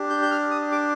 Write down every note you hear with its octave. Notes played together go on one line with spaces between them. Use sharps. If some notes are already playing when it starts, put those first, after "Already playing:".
Already playing: D4 G4
G6
G6
F6
D#6
D6